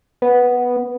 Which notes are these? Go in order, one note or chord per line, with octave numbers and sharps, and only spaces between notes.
B3